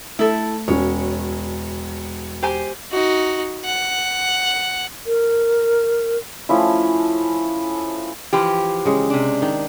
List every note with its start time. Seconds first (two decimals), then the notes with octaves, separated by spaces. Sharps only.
0.19 A3 E4 A4
0.68 E1 C#4 F#4 C#5
2.43 G4 C5 G#5
2.92 D#4 F#4
3.65 F#5
5.06 A#4
6.49 F3 A3 C#4 E4
8.33 E3 F3 G4
8.85 C#3 G#3
9.10 C3 D4
9.42 D#3